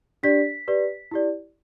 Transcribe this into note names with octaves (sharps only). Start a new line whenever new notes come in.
D4 G4 D5 B6
G4 B4 D5
E4 G4 D5